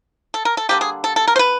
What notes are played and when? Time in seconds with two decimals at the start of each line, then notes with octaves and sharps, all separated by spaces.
0.34 A4
0.45 A#4
0.57 A4
0.69 D3 G3 A#3 G4
0.81 G#4
1.04 A4
1.16 A4
1.27 A#4
1.36 C5
1.39 B4